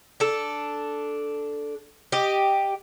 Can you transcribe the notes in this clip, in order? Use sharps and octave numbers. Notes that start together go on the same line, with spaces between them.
D4 A4
G4 D#5